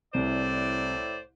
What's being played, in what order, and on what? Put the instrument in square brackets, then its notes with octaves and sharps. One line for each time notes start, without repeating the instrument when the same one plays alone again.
[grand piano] C2 [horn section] A2 C5 D5